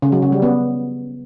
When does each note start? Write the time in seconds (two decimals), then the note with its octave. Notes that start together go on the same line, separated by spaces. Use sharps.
0.02 C#3
0.12 F#3
0.22 C#3
0.32 G3
0.42 B3